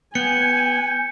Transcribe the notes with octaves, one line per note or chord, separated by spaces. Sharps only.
B3 G5 G#5 C#7